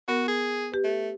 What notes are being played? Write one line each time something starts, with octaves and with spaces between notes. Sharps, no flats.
B3 F#4 A#4
G#4
G4 B4
A3